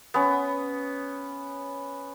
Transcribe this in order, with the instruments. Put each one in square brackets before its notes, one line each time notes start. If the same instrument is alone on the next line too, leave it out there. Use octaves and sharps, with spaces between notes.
[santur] B3 C#4